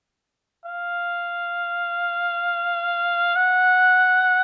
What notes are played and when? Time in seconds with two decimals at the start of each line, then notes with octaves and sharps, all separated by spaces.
0.65 F5
3.36 F#5